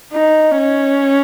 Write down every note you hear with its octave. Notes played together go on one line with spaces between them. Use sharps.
D#4
C#4